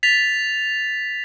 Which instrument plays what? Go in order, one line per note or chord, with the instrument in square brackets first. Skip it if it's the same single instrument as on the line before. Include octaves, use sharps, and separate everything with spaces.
[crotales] A6 B6 F7